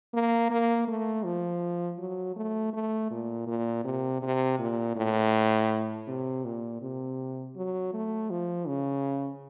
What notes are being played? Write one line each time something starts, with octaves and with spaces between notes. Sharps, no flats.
A#3
A#3
A3
F3
F#3
A3
A3
A#2
A#2
C3
C3
A#2
A2
C3
A#2
C3
F#3
A3
F3
C#3